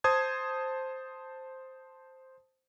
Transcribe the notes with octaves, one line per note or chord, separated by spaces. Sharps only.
C5 A5 D#6 G#6